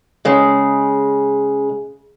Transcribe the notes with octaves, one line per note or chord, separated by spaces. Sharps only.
C#3 G#3